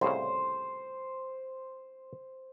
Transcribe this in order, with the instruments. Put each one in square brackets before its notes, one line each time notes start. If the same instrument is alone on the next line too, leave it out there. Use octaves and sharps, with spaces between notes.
[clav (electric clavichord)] C2 A2 C#3 [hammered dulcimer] C5